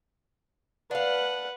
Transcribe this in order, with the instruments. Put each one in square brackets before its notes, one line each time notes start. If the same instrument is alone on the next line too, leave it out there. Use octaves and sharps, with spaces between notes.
[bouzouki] D4 F5 [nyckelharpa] B4 F#5